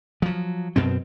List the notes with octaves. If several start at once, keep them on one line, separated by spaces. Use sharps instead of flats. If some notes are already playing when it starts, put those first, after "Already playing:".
F3 F#3
F#2 B2 C4